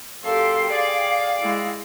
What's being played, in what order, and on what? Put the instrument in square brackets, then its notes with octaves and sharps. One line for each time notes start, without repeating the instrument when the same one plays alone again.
[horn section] F#2 A#3 C6 [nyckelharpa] G4 A4 [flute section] F5 G5
[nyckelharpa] G#4 [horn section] D5
[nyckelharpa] G#3 E4